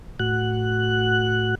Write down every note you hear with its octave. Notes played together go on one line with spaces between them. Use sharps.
A2 F#4 F#6